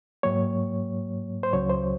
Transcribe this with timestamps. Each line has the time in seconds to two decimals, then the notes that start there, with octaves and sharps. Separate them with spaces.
0.23 G#2 F#3 A#3 C#5
1.43 C5
1.53 C#2 C#3 F#3 C#5
1.70 C5